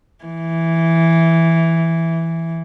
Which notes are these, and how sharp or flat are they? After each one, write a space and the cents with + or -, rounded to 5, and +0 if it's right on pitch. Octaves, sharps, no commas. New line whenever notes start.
E3 +0